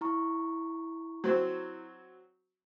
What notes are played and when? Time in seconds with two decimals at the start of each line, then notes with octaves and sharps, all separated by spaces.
0.01 E4 A#5 C#6
1.24 F#3 C4